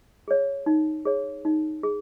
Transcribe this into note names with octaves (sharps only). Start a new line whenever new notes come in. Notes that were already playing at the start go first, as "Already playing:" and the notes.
G#4 C#5
D#4
G#4 C#5
D#4
G#4